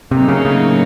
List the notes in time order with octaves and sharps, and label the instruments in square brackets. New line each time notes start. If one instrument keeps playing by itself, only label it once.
[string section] A2 F#3 A#3 D#4 [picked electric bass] C3
[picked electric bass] C#3
C#3